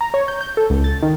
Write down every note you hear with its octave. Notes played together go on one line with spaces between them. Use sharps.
A#5
C#5
G6
G6
A4
C#2
A6
D#3